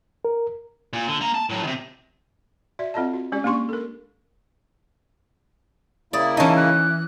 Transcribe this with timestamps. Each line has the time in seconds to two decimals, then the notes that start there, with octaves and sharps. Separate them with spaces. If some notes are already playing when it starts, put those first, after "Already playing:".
0.25 A#4
0.93 A#2
1.08 D3
1.21 A#3 A#5
1.34 A5
1.50 A2 F#3
1.63 C3 D#3
2.79 F#4 D5 E5
2.94 C4 F4 A4 D#5 A5
3.13 F#4
3.32 G#3 C#4 G4 D5
3.44 A#3 D4 G4 C6 C#6
3.69 A4 A#4
6.13 C#3 A#3 E4 D5 D#6
6.37 E3 C#4 D#4 D#5 A5
6.56 F#6